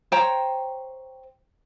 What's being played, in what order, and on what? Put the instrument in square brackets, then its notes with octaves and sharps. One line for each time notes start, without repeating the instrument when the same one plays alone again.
[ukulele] C5 C#5 G5 A#5